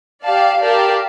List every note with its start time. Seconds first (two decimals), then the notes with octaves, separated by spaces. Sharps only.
0.24 G4 D5 F5 A5
0.61 G4 A#4 D5 F5 A5